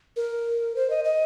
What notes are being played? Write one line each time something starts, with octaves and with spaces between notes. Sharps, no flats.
A#4
C5
D#5
D#5